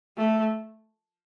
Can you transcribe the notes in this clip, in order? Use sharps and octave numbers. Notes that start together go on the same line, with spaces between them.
A3